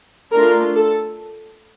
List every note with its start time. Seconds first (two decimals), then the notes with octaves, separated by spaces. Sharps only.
0.32 A3 D4 F4 A#4
0.75 A4